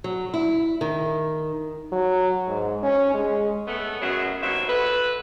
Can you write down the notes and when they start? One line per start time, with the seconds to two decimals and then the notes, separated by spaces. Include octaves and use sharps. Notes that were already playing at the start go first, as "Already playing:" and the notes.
0.04 F#3
0.34 E4
0.81 D#3
1.92 F#3
2.48 G#2
2.83 C#4
3.14 G#3
3.67 A3 B3
4.01 F#2 B2 F#3 G#4 E5
4.42 D#2 B2 F#3 C4 E5
4.68 F#4 A4 B4